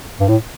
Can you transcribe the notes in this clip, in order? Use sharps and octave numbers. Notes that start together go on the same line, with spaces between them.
G2
A2